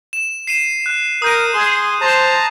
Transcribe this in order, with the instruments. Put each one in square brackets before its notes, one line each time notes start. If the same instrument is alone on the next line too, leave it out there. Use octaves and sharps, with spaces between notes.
[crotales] E7
C7 D#7 E7
F#6
[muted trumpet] A#4 [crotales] D#6 G6 D#7
[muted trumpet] G#4 [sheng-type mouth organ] C6
[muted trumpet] C5 [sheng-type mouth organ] A5 A#5